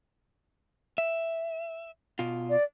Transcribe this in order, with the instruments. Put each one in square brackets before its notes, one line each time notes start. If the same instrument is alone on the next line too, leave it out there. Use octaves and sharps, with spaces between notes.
[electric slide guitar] E5
B2 F4
[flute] D5